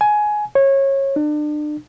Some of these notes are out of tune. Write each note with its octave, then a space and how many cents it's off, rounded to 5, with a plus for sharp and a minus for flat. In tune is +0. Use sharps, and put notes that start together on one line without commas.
G#5 +15
C#5 -25
D4 +35